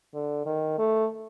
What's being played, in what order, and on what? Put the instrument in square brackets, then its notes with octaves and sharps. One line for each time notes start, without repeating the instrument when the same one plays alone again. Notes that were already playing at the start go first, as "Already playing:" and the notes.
[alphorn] D3
D#3
A3